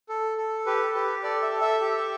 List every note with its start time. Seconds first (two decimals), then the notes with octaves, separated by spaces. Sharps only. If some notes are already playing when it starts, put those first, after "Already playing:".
0.09 A4
0.38 A4
0.66 G4 B4
0.95 G4 B4
1.23 A4 D5
1.42 E5
1.52 A4
1.61 E5
1.81 G4